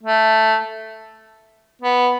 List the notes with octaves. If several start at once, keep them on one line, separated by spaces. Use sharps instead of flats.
A3
B3